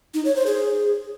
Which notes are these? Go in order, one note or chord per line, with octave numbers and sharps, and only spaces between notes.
D#4
C#5
C5
G#4